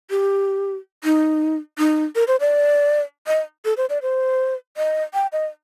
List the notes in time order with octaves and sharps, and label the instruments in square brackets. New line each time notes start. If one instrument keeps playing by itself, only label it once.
[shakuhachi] G4
D#4
D#4
A#4
C5
D5
D#5
A4
C5
D5
C5
D#5
G5
D#5